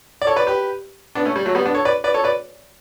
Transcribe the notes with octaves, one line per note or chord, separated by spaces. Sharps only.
D5
A4 C#5
B4 D5
G4 B4
B3 D4
A3 C#4
G3
F#3 A3
G3 B3
B3 D4
A4 C#5
B4 D5
B4 D5
A4 C#5
B4 D5